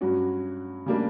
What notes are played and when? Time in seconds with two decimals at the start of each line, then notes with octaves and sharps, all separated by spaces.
0.01 G2 F#3 C#4 F#4
0.86 C#3 G3 A#3 D4